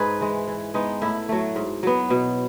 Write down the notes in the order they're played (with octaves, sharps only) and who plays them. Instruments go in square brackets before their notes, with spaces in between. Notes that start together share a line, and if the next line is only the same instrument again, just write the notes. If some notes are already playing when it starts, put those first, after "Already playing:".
Already playing: [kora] G#2 D#4 G#4 B4
E3 G#3
E3
G#3 B3 D#4
A2 E4
F#3 A3
G#2
F#3 B3
B2